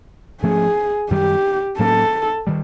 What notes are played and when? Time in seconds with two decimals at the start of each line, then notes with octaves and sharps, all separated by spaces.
0.42 G#2 F3 A3 C#4 G#4
1.10 F#2 D#3 G3 G4
1.79 A2 F#3 A#3 C#4 A4
2.47 D#3 G3